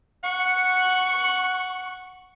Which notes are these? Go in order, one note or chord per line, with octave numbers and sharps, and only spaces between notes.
F#5 C#6